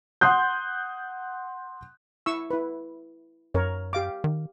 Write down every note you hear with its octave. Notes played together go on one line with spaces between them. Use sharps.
F#5 C6 D#6 F#6 G6
E4 C#6 E6
E4 B4
F#2 A#4 C#5
G4 F5 D6
D#3